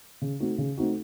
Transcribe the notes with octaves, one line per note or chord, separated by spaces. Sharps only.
C#3
A3 C4 D#4 F#4
C#3
A3 C4 D#4 F#4